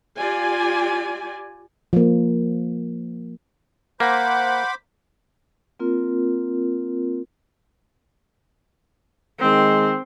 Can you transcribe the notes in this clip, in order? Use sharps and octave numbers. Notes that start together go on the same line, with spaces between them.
F4 G4 D5 G#5
F3 A#3
A#3 C5 F#5 B5 D6
A#3 C4 F4 A#4
D#3 G#3 C4